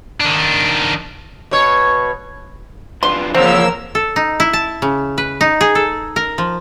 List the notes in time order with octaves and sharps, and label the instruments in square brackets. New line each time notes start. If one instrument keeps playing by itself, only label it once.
[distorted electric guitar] D#3 D4
[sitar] B2 C#5
[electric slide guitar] D4 F4 B4 [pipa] C6
[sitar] E2 A2 C#3 [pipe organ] F3 A#3 E6 [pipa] C4 [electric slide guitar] A#4
[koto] A4
D#4
E4
A5
C#3
B4
D#4
G#4
A4
A#4
F3